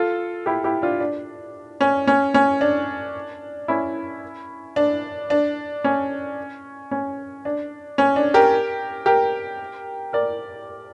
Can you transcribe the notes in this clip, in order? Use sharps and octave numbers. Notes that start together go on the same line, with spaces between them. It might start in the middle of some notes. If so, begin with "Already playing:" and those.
Already playing: F4 A4
E4 G4
E4 G4
D4 F4
D4
C#4
C#4
C#4
D4
C#4 E4
D4
D4
C#4
C#4
D4
C#4
D4
G4 A#4
G4 A#4
A#4 D5